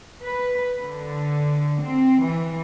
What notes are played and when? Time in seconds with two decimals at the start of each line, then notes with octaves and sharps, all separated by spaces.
0.23 B4
0.80 D3
1.81 C4
2.21 E3